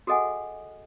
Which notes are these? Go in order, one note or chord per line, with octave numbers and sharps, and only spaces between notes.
F#4 G#4 A4 D#5 F#5 G#5